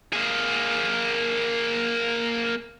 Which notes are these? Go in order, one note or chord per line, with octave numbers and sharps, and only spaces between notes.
A#3 G#4